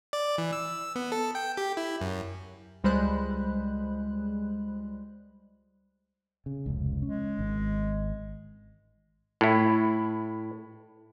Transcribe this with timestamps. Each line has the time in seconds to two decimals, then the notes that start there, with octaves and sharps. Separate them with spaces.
0.13 D5
0.38 E3
0.53 E6
0.95 B3
1.12 A4
1.35 G5
1.57 G4
1.77 E4
2.01 F#2
2.84 C#2 G3 G#3 C5 B5 F#6
6.46 C#3
6.66 F1 C#2
7.02 G#3 C#4
7.39 G#1
9.41 A2 E4